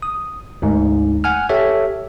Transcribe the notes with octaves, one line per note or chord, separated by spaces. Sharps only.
D#6
D2 G#2
F#5 G#5 F6
G4 A4 C#5 E5